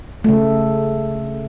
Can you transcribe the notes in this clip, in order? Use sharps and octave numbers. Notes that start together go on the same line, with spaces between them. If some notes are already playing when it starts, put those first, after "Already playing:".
C#3 A3